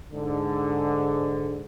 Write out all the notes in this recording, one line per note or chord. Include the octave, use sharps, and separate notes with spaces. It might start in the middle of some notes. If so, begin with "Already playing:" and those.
G#2 D3